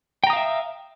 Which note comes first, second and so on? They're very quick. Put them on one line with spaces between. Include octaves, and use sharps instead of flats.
G5 A#5 D#6 F5 E5